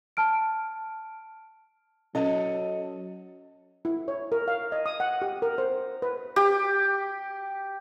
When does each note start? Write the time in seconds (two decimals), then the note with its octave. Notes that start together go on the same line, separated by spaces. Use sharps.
0.17 A5 F6 D7
2.15 F#3 C#4 A4 D#5
3.85 E4
4.08 C#5
4.32 A#4
4.48 F5
4.72 D#5
4.86 D#6
5.00 F#5
5.22 G4
5.42 A#4
5.58 C5
6.02 B4
6.36 G4